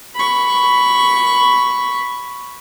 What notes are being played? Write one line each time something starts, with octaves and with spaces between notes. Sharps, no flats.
B5 C#6